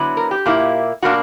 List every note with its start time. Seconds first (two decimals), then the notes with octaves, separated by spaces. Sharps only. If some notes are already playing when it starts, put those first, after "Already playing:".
Already playing: D3 F#3 B3 E4
0.17 A#4
0.31 G4
0.46 A#2 A#3 E4
1.02 B2 A#3 D4 F#4